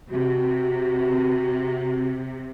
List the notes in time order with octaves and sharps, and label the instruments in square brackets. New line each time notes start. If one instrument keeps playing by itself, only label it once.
[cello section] C3 [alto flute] F#4